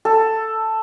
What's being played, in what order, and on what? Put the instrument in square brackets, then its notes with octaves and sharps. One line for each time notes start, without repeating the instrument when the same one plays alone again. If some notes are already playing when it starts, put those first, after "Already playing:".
[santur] A4